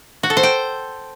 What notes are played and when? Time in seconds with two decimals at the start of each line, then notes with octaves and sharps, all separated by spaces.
0.23 F#4
0.30 A4
0.37 C5
0.43 G5